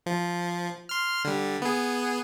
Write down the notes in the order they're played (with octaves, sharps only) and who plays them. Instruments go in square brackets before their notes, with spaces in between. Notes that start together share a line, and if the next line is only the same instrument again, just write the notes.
[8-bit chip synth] F3
C6 F6
D3 G3
B3 G#4